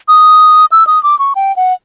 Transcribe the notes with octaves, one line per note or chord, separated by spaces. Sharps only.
D#6
E6
D#6
D6
C#6
G5
F#5